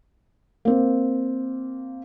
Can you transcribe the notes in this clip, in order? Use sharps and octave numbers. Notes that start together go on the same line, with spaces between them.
A#3 C4